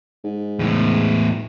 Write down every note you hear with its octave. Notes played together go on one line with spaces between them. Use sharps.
G#2
E2 A2